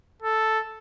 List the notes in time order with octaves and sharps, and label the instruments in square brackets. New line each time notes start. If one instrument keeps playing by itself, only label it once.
[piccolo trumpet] A4